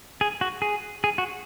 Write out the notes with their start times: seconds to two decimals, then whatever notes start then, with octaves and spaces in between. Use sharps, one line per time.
0.21 G#4
0.41 F#4
0.62 G#4
1.04 G#4
1.18 F#4